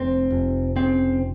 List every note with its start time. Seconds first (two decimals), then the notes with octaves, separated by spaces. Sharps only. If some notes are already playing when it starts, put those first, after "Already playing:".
Already playing: F1 C4
0.31 F1
0.76 C#3 C4